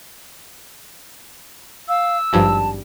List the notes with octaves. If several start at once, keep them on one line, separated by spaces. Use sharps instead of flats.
F5 E6
G#1 G2 F3 A5